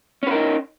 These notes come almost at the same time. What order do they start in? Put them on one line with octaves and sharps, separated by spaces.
C#4 B4 A#4 D#4